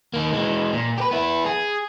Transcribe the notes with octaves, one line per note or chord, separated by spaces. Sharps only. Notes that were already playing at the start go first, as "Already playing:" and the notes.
D#3 A#3
E3 G#3
A#2
G4 B4
B3 E4
G#4